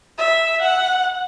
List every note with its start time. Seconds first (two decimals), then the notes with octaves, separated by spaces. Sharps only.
0.18 E5
0.62 F#5